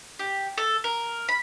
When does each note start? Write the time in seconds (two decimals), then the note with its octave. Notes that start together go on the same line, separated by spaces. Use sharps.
0.19 G4
0.58 A4
0.84 A#4
1.28 B5